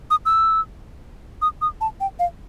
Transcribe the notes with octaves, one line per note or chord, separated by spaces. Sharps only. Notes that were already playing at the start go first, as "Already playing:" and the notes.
D#6
E6
D#6
D#6
A5
G5
F5